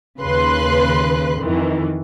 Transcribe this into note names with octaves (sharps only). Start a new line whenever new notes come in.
D#2 C#3 B4 C6 F#6
F2 D#3 E3